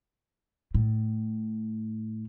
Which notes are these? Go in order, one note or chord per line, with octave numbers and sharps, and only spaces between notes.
A2